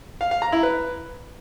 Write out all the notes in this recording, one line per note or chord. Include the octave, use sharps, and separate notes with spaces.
F5
F5
A#5
E4
B4